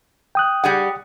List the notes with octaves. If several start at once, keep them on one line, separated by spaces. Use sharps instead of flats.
G5 D#6 F#6
G3 G#4 F#5